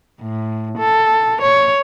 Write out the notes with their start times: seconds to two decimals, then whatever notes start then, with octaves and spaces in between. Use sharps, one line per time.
0.21 A2
0.79 A4
1.41 C#5